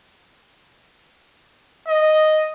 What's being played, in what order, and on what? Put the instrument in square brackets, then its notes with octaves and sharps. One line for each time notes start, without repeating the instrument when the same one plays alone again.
[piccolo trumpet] D#5